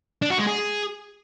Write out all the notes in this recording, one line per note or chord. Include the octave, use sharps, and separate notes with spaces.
D4
F#4
G#3
G#4